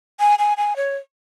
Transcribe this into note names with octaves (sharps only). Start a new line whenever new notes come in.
G#5
G#5
G#5
C#5